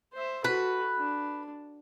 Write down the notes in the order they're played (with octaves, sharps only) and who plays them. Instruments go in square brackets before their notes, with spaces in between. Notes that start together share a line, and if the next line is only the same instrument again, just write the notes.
[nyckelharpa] C5 E5
[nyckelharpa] F#4 A4 [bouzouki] B4
[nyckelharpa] D4